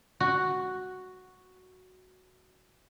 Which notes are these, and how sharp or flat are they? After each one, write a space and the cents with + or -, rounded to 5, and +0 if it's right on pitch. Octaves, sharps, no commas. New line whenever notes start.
F#4 +0